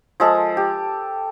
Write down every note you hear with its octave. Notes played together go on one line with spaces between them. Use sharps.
F3 G#3 A4
G4